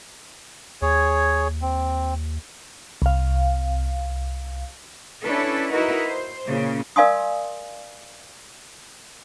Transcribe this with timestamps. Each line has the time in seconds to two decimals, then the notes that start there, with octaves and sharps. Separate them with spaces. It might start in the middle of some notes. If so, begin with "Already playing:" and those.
0.82 D#2 G#4 C#5
1.62 C4
3.02 C2 F5
5.23 C#4 D4 E4 A4 B4
5.72 D#4 E4 F#4 A#4 B4
6.06 C5
6.47 A#2 C#3
6.96 A#4 D5 F5 G#5 C6 D#6